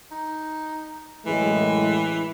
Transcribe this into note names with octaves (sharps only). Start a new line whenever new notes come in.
D#4
F#2 A2 E3 G#3